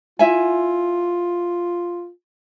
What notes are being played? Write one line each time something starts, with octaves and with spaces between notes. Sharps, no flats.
E4 F4 E5 G#5